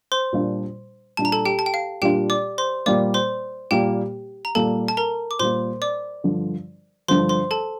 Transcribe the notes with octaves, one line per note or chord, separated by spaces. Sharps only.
C5 C6
A#2 G3 D4 F4
A#2 G3 D4 F4 A5
A#5
A4 A5
G4 G5
A5
G5
F5
A#2 G3 D4 F4 G4 G5
D5 D6
C5 C6
A#2 G3 A#3 D5 D6
C5 C6
A#2 G3 A#3 G4 G5
A#5
A#2 G3 A#3 A4 A5
A5
A#4 A#5
D6
A#2 G3 A#3 C5 C6
D5 D6
G2 D3 F3
G2 D3 F3 C5 C6
C5 C6
A4 A5